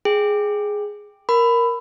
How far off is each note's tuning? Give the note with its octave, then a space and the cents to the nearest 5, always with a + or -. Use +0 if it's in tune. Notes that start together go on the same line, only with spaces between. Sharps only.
G#4 +0 G5 +5
A#4 +5 B5 +15